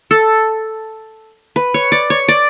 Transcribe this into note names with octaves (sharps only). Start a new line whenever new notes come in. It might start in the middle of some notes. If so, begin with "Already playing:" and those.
A4
B4
C#5
D5
C#5
D5